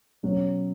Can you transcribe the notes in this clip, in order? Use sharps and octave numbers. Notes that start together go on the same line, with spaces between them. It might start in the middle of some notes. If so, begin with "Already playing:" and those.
B2 F#3 C#4